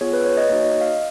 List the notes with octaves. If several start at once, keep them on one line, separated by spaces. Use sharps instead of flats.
B3 F4 G#4 C#5
B4
C#5
D#5
A#3 D#4 F#4 C#5
D#5
F5